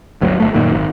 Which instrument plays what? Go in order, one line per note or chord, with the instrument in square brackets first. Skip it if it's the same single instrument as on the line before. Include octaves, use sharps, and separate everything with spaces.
[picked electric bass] G1 D2 F#3
G1 A3
F#2 A#2 D#3
G#1